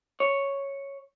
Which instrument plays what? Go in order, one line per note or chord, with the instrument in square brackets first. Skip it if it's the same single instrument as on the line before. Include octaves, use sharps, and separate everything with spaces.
[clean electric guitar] C#5